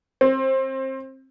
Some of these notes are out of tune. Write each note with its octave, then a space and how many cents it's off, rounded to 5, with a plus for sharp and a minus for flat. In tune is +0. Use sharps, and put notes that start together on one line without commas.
C4 +20